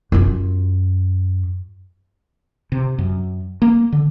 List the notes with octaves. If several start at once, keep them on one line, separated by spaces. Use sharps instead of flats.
F#2 F4
C3
F#2
A#3
D3